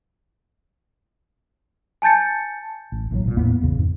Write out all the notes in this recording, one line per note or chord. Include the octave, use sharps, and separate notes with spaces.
G#5 A5 G6 A6 C#7
A1
A#1 A2 F3 F#3
G#1 A#2
E2 A2 A#3 B3
A1 E2 C#3
F2 G#2